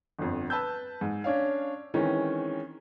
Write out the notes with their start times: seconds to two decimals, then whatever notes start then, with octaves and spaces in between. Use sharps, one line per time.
0.19 G1 F2
0.50 B4 A5 B5 E6 G6
1.01 G#2
1.24 C#4 D4 C#5 F5
1.94 D#3 E3 G#3 C4 C#4